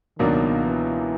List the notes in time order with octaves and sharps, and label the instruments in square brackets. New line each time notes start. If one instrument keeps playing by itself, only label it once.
[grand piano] C#2 B2 F#3 A#3 D4 [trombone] D#3
[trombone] E3